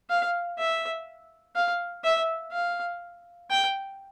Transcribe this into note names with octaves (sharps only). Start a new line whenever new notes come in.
F5
E5
F5
E5
F5
G5